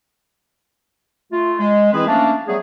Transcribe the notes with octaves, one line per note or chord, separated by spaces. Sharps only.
A3 F4
G#3
E3 C4 E4 G#4 B4
F3 A3 A#3 C#4 D4
F#3 G3 A3 B3 G#4